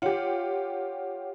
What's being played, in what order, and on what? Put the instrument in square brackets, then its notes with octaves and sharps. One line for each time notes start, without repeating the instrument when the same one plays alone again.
[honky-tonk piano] F4 G4 [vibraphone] C#5 F#5